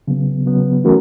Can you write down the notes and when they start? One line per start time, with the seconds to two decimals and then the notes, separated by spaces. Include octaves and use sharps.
0.08 C#3 F#3 B3
0.46 C#3 F#3 B3
0.84 E3 A3 C#4 F#4 A#4